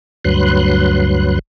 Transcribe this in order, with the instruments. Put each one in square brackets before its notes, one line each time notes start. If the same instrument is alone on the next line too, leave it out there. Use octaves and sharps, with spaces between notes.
[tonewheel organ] D2 G2 F#3 B4 C6 F#6